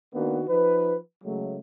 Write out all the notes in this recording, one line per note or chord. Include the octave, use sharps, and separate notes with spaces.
D#3 A#3 B3 D4 F#4
F3 D#4 B4
C#3 F#3 G#3 A3